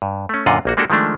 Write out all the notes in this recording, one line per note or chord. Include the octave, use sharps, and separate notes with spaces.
G2
A3 C#4
F#2 A#2 D3 F4 D#5 F#5
A#1 A#3 F#4
G#3 A#3 D4 F#4 G4 A4
D#3 F3 G#3 A3 D4